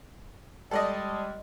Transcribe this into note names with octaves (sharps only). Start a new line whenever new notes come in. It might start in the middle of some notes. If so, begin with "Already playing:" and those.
G3 G#3 A4 D5 D#5